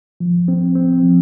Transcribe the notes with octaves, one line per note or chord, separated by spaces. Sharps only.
F3
C4
C4
F3